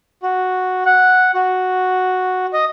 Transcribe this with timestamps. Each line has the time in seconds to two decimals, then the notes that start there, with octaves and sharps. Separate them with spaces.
0.23 F#4
0.86 F#5
1.34 F#4
2.53 D#5